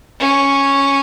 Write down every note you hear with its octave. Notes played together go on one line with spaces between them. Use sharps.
C#4